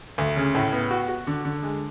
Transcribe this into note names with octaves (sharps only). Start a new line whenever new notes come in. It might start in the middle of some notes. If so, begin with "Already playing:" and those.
D2
C#3
A2
B3
F#4
F#4
D3
D3
G#3